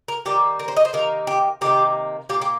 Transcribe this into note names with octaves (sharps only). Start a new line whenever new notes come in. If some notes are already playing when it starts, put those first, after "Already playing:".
A#4
D#3 G3 A#3 G4
A#4
C5
D#5
C5
C3 D#3 A#3 A#4
G4
C3 D#3 A#3 G4
A#2 A#3 G4
G4